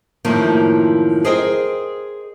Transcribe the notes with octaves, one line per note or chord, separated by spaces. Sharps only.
F#2 A2 D#3 F3 A#3
G#4 A#4 C5 D#5 G5